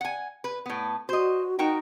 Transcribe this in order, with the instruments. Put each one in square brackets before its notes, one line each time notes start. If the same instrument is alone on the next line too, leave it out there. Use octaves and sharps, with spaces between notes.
[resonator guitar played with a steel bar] F#5 G#5
B4
A2 B3
[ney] F#4 [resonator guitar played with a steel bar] C5 D#5
[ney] D#4 [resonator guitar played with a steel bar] F#4 A#4 G5